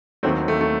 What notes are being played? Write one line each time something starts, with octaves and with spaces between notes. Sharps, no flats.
D#2 D#3 F#3 A3 C4
A3
A3